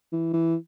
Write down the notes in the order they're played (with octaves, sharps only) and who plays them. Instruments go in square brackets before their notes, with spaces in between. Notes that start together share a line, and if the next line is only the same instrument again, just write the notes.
[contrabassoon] E3
E3